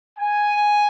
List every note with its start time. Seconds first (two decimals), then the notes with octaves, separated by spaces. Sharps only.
0.18 G#5